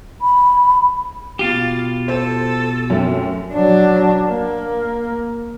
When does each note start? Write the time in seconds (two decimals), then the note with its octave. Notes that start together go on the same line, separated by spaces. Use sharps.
0.22 B5
1.39 B2 F4 G4 F5 A6
2.08 A4 C5
2.90 F#2 A3 C4
3.53 F#3 D4
4.28 A#3